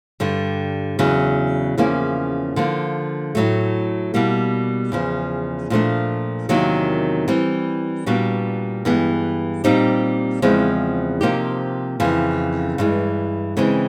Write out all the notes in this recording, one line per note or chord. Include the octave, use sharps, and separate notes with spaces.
G2 D3 G3
E2 C#3 F#3
E2 C#3 F3 A#3 C#4
D3 F3 A#3
A2 F#3 A3
B2 G3 A#3
E2 C#3 F3
A#2 F3 A3 D4
E2 C3 D#3 F#3 A#3
E3 G3 C4
A#2 G3 B3 D4 F#4
G2 E3 G#3 B3
A#2 G3 C4 D#4 G4
E2 C#3 F3 G#3 C4
C3 F3 A#3 D#4 G4
F2 C#3 E3
G2 E3 G#3
C#3 E3 G#3 C4